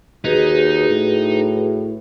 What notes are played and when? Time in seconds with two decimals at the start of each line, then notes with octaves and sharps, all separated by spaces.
0.24 D#2 D#4 F#4 G#4 B4
0.89 A2